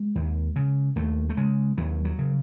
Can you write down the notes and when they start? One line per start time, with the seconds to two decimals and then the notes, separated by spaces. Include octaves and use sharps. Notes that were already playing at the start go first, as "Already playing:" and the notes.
Already playing: G#3
0.15 D#2
0.56 C#3
0.96 D#2 A3
1.29 A3
1.37 C#3 G#3
1.78 D#2 F#3
2.05 F#3
2.18 C#3